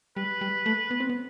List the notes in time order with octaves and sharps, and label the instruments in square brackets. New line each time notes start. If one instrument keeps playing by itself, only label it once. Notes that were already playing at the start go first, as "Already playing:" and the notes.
[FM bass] G3 [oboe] B4
[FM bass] G3
A3
B3
C4
B3